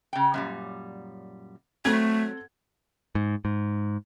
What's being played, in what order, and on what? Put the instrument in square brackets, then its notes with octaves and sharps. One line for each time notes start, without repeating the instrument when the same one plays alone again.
[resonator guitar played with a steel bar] C#3 G5
F#2 A#2 G3
[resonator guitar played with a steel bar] F#3 [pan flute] A3 [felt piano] C4 A4 G#6
[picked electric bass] G#2
G#2